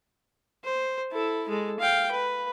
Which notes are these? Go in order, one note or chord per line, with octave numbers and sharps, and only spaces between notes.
C5
E4 A4
G#3 A4
F5 G5
B4